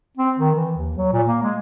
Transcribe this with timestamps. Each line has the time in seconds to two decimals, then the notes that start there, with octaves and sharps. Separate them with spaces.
0.17 C4
0.39 D#3
0.55 E3
0.77 D#2
0.98 F#3
1.13 A#2
1.27 A#3
1.43 G#3